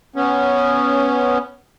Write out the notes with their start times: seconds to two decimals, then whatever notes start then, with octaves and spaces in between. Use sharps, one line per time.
0.16 B3 C#4